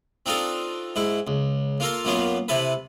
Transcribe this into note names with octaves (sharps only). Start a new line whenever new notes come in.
C4 D4 D#4 F4 A4
G#2 E4
C#2
A#3 F4 A4 A#4
F#2 F#3 A#3 B3 F4
C3 E4 A4 B4